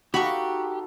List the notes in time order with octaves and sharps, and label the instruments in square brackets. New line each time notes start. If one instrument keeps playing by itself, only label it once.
[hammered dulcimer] D#4 A4 F5 [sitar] F#4 [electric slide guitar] G4 [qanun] B5 C#6